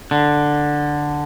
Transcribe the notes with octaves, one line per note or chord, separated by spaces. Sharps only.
D3